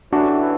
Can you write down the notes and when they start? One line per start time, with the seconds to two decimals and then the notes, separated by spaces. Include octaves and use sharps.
0.12 A1 A2 E3 D4 F#4